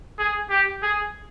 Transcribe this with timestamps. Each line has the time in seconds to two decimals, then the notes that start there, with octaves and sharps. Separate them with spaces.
0.19 G#4
0.50 G4
0.83 G#4